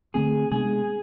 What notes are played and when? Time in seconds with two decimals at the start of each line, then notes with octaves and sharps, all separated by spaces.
0.14 D3 A3 C4 G#4
0.51 C3 G#3 B3 D4 G#4